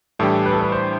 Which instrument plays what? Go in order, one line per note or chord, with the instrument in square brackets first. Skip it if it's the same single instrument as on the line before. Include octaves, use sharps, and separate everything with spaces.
[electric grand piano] A2 E3 G3 D4 G4 [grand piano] A4
[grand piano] B4
A4
B4
C5